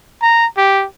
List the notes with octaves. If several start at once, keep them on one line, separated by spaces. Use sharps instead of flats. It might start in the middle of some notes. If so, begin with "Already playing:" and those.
A#5
G4